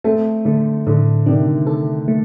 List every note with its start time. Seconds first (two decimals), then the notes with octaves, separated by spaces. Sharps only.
0.04 A3 C4 A4
0.45 D3 A3
0.87 A2 D3
1.26 C3 D#3 D4
1.67 A4
2.08 A3